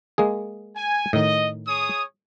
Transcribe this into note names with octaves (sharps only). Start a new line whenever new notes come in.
G#3 A#3 G#4
G#5
A2 D#3 D#5
G#4 C#5 D#6